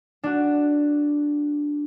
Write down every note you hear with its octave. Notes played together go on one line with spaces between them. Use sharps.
D4 F#4